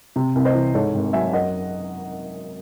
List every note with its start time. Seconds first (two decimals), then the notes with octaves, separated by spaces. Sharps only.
0.16 C3
0.35 C2
0.45 C5 D#5
0.55 E3
0.74 G#2 A4 C#5
0.94 G#1
1.13 F#3 E5 G#5
1.33 F#2 D#5 F#5